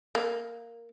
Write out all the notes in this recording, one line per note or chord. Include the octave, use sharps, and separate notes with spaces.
A#3